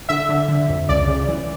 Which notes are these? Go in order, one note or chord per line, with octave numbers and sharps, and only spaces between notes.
D3 E5
D3
D3
F2
C#2 D5
C#3
E3